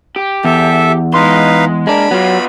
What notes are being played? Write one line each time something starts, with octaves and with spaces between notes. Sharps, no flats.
G4
E2 A4 E5
G#3 D#4 B4 F5 C6
G#3 A#3 D4 B5
F#3 B3 F4